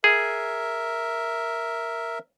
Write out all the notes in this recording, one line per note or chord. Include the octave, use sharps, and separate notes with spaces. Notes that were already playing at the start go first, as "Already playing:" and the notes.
G#4 A#4 E5